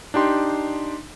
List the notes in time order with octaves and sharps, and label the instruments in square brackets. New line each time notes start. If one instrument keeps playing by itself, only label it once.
[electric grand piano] D4 D#4 G4 C6